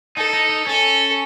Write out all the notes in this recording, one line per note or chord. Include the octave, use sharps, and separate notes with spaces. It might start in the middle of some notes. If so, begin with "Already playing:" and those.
D#4 A4
D#4
D#4
C#4 A4